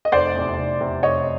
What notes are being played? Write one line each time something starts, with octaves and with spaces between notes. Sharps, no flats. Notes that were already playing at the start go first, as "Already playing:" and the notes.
D#5
F1 C5 D5
E2 C3
F1
E2 C3
F1 C#5 D#5